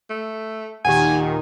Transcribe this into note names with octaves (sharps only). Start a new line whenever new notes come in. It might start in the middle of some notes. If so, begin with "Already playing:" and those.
A3
D#2 A#2 D#3 G4 F#5 G#5